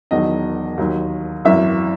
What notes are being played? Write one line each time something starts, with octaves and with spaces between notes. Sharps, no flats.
E1 E2 D#3 F#3 D#5
D#2 D#3 F#3
G#1 F#2 E3 E5